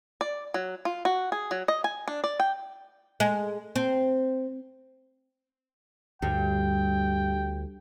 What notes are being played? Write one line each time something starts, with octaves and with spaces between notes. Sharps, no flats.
D5
F#3
F4
F#4
G#4
F#3
D#5
G#5
D4
D5
G5
G#3
C4
D2 G2 G5